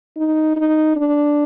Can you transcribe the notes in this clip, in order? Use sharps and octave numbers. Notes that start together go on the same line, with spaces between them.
D#4
D#4
D4